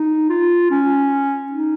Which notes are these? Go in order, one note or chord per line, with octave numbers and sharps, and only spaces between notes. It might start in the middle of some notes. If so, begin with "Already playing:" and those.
Already playing: D#4
F4
C#4
D#4